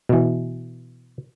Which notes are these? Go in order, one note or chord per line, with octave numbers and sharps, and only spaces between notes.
B2 E3